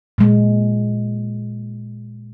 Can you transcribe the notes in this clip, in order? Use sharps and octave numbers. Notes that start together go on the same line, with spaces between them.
A#2 G#3